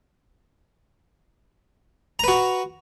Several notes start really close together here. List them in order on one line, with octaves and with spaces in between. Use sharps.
A#5 B4 F#4